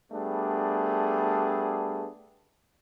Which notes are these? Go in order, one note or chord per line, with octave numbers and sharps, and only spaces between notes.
G3 A3 B3 D4 G#4